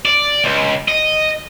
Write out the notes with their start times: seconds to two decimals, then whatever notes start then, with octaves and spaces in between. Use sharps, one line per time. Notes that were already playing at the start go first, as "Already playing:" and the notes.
0.05 D5
0.44 C#2
0.88 D#5